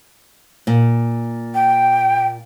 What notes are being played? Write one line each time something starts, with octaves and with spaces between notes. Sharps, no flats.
A#2
G5